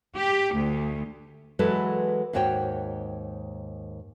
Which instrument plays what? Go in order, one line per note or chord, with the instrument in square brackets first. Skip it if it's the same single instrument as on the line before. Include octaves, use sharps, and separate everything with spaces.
[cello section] G4
D2
[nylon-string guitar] E3 F#3 G#3 F#4 A4 B4
D#2 G#2 F#4 C#5 G5